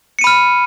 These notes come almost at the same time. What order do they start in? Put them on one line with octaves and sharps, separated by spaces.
C#7 D#7 B5 F6